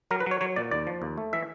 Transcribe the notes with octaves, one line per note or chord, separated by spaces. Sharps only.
F#3 A#4
B4
F#3 C#5
F#3 C#5
A#2 D5
D#2 D5
F3
D#2
A3
E3 E5